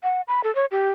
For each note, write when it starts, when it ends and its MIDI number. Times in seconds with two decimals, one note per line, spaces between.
0.03 0.21 78
0.28 0.41 83
0.44 0.53 69
0.55 0.65 73
0.71 0.90 67